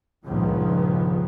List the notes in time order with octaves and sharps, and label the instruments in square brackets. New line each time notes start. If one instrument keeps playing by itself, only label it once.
[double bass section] C#2 G2 A#2 D#3 F3 B3